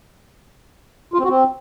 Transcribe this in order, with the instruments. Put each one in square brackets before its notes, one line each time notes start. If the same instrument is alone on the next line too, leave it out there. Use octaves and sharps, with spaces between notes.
[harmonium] F4
C4
F#4
C4